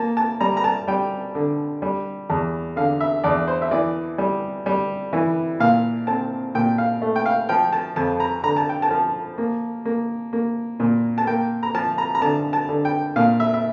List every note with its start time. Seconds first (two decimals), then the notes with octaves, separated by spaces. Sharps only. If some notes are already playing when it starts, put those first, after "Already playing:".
Already playing: A#3 A5
0.17 A5
0.40 G3 A#5
0.57 A#5
0.64 A5
0.88 G3 G5
1.35 D3
1.82 G3
2.30 E2
2.76 D3 F5
3.01 E5
3.24 E2 D5
3.48 C5
3.62 E5
3.71 E3 D5
4.18 G3
4.66 G3
5.13 E3
5.60 A#2 F5
6.07 C4 A5
6.55 A#2 G5
6.78 F5
7.02 A3
7.16 G5
7.26 F5
7.49 F3 G5
7.72 A5
7.96 F2 A5
8.20 A#5
8.43 D3 A#5
8.57 A5
8.69 G5
8.82 A5
8.91 F3
9.38 A#3
9.85 A#3
10.33 A#3
10.80 A#2
11.18 A5
11.27 A#3 G5
11.63 A#5
11.74 F3 A5
11.98 A#5
12.15 A#5
12.22 D3 A5
12.53 A5
12.69 D3
12.85 G5
13.16 A#2 F5
13.40 E5
13.54 E5